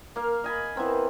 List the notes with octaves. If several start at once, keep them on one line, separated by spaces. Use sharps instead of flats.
A#3 F5
D#5 G#5 B5
E3 B3 C4 A#4